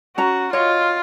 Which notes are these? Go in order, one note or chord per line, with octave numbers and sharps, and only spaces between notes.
C#4 F#4 A#5
F4 C#5 D#5